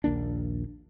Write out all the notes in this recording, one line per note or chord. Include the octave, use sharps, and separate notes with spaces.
A#1 D#2 A#3 D4